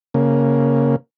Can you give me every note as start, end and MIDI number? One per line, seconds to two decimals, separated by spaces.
0.14 0.96 49
0.14 0.96 58